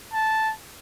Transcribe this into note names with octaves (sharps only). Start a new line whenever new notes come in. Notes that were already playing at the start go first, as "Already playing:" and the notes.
A5